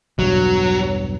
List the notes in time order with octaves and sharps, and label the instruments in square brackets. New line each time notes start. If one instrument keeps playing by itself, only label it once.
[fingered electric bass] B1 E2 G2 [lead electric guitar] F#3